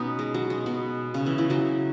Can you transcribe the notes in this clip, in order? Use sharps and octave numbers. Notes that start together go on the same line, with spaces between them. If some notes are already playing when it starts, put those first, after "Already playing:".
Already playing: B2 B3 C#4 D#4
G#3
F#3
G#3
B2 B3
C#3 C#4
E3 E4
E3 E4
F#3 F#4